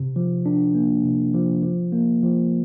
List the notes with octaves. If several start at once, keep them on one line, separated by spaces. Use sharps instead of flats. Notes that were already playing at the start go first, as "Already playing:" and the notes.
Already playing: C3
F3
D4
A#3
C3
F3
F3
A#3
F3